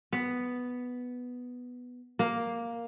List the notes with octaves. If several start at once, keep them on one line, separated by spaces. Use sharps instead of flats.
B3
A#3